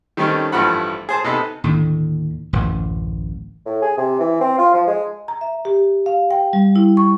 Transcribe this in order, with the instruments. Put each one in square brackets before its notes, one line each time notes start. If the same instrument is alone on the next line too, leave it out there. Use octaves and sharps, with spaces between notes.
[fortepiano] D#3 G3 A3 C4 C#4 D#4
A1 G2 F3 A3 F#5 B5
G#4 C5 A5
C3 B3 D#4 A4 B4
[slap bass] D#2 A2 D3
D1 A1 F#2
[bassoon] A2
G#4
C3
E3
C4
F4
F3
G#3
[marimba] A#5
E5
G4
F5
G5
G3
E4
C#6